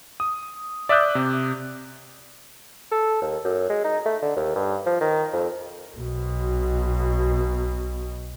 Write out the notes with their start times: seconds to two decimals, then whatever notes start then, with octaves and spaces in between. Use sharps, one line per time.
0.20 D#6
0.89 D5 E5 D6 D#6 F#6 G6
1.15 C3
2.92 A4
3.22 D#2
3.45 F#2
3.70 G#3
3.85 D#4
4.06 A3
4.22 D3
4.36 D#2
4.56 G2
4.86 F3
5.01 D#3
5.33 F2
5.97 B1 B2